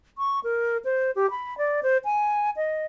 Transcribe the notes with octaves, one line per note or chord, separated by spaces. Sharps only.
C#6
A#4
C5
G4
B5
D5
C5
G#5
D#5